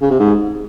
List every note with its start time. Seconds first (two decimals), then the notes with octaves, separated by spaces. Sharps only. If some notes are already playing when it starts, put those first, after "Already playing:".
0.01 C#3
0.10 C3
0.19 G#2